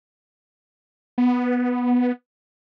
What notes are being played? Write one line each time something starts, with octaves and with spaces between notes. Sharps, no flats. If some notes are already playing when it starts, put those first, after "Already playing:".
B3